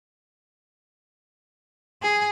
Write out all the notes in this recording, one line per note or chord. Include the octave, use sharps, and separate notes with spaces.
G#4